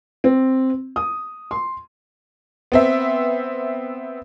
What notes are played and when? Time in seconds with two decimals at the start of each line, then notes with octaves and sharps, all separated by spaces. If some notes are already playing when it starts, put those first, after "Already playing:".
0.24 C4
0.96 D#6
1.51 C6
2.72 B3 C4 E5